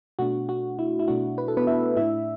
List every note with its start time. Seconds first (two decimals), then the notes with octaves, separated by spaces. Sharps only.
0.19 B2 A3 D4 F#4
0.49 F#4
0.79 E4
0.99 E4
1.08 B2 A3 D4 F#4
1.38 B4
1.48 A4
1.57 B3 B4
1.67 E4 E5
1.96 A2 A3 D4 E4 E5